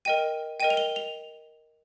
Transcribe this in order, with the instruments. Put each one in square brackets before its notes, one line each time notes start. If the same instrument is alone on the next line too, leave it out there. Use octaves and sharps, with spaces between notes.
[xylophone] A#4 D#5 G5 D#7
A#4 D#5 G5 D#7
F7
G7
F7